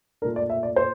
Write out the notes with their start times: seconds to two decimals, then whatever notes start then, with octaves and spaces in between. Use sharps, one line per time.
0.22 A#2 A3 D4 A#4
0.36 D5
0.50 E5
0.63 D5
0.76 C5